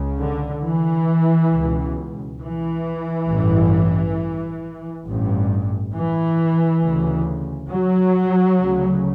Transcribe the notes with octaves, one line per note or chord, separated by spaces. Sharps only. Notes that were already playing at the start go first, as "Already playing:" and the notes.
Already playing: C#2 C#3
D3
E3
C#2 B2
E3
A1 G2
A1 G2
E3
D2 C#3
F#3
D2 C#3